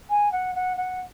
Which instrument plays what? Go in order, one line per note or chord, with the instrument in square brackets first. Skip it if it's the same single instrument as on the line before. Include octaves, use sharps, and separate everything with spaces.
[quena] G#5
F#5
F#5
F#5